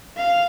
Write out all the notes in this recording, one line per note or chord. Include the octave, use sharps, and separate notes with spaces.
F5